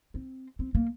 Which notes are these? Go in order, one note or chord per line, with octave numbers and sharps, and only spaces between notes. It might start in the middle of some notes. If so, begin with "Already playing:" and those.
C4
C4
A#3